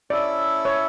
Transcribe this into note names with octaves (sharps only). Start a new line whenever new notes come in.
C#4 E4 A4 D5 E5
C#5